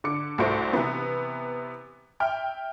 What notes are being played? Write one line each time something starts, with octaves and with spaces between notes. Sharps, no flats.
D3 D6 C#7
C2 A3 F#4 C5 D7
C3 E3 B3
E5 G5 F6